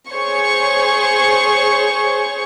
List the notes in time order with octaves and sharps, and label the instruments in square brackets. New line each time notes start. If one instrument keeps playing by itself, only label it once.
[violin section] G#4 C5 C#5 C#6